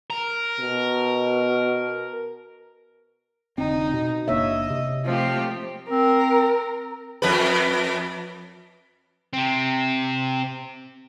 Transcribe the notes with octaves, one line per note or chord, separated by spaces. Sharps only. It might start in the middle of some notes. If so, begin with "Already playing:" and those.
A#4
B2
F1 D3 C4 D#4
B2
F#1 A#3 D4 C#5 D#5 E5
C3
F3 A3 C4 G4
C4 A#4
F2 B4
C3 C4